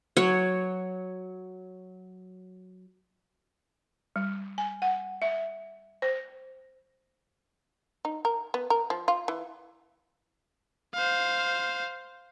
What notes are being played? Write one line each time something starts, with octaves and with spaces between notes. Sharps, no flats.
F#3 C#5
G3
G#5
F#5
E5
C5
D#4
A#4
B3
A#4
F3
F4
E3
C5 F5